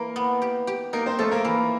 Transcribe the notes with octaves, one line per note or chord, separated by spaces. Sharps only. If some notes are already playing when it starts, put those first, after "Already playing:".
Already playing: E3 A#3 A#4
B3
G4
G4
A#3 D#4 A#4
C4 C5
F3 A3 A4
A#3 A#4
E3